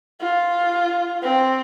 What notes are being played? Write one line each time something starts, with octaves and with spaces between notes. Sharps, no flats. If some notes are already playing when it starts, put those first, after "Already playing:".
F4
C4